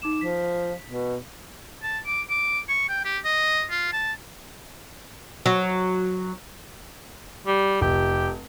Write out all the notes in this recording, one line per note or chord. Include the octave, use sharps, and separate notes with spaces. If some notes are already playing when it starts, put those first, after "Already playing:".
D#4 D6 E7
F3 B6
B2
A5
D6
D6
C#6
G5
G4
D#5
F4
A5
F#3
G3
F1 G4